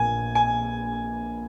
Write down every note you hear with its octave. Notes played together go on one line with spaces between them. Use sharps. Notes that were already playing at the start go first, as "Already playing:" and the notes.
Already playing: A#1 A#2 A#3 G#5
G#5